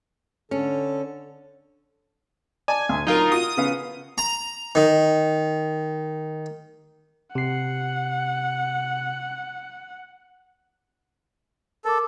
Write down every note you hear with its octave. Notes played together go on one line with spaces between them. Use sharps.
D3 C#4 A4
D5 G#5 A5
D2
F#3 D#4 F4 A#4
F4 F#4 D#6
C#3 B3 F5
A#5
D#3
C3 F#5 C7
A4 A#4 D6